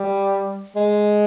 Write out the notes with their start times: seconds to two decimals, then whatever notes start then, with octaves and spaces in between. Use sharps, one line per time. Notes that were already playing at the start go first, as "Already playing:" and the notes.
Already playing: G3
0.76 G#3